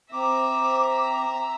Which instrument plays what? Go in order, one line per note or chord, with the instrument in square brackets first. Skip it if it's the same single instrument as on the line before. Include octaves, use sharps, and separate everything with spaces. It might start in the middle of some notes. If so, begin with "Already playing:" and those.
[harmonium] C4 [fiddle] E5 A#5 [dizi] D6